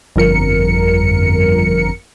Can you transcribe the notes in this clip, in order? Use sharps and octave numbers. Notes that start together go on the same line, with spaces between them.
G1 F2 A#4 C#7